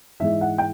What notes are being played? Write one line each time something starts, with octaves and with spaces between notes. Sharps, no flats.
G#2 E3 G#3 E5
F#5
G5